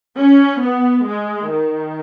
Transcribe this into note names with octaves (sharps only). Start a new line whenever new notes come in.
C#4
B3
G#3
D#3